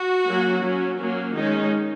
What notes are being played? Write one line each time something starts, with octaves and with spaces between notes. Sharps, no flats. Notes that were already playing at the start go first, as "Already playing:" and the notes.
Already playing: F#4
F#3 A#3 C#4
F#3 C#4
F#3 A#3 C#4
D#3 G#3 C#4 D#4